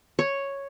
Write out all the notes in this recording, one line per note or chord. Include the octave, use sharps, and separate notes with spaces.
C#5